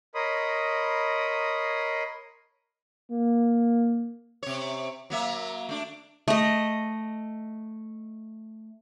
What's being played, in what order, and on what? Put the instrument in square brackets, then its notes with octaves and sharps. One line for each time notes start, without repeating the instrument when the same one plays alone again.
[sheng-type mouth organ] A#4 C#5 D#5 B5 C6 D#6
[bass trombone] A#3
[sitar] C3 C#5
F#3 A#3 E5
A3 D4
[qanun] A3 D#5